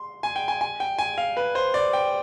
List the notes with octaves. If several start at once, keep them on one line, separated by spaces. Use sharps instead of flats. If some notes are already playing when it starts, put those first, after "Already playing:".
Already playing: C6
G#5
G5
G#5
G#5
G5
G#5
F5
B4
C5
D5
G5